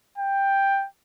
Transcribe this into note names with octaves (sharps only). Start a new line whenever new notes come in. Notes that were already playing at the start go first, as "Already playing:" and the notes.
G5